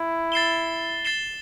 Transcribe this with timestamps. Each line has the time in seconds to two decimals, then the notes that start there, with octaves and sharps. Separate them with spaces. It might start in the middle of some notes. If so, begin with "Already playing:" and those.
Already playing: E4
0.32 A6 C7 E7 G7
1.05 A6 C7 E7 G7